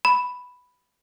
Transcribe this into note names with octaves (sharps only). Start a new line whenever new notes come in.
B5